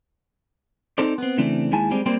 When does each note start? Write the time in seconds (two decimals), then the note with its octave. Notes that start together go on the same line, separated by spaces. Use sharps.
0.98 C4 D#4 A4 C5 D5
1.18 B3 C4
1.37 C#3 E3 A3 C4 D4
1.72 D#2 G#3 E4 G#5 A5
1.91 G3 G#3 C4 D5
2.06 G3 A#3 C4 G4 C5 D5